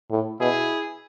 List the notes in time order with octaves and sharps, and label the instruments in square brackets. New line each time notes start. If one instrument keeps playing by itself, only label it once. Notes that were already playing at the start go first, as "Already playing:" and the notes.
[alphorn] A2
[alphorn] B2 [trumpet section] E4 G#4